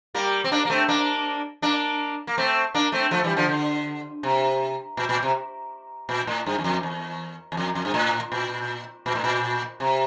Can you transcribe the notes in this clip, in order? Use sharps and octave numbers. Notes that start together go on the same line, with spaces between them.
G3 A#3
C4
A#3 D4
A#3
A3 C4
A#3 D4
A#3 D4
A#3
A3 C4
A#3 D4
A3 C4
F3 A3
E3 G3
D3 F3
D3
C3
A#2
A#2
C3
A#2
A2
G2
E2
F2
E2
E2
F2
F2
G2
A2
A#2
A#2
A2
A#2
C3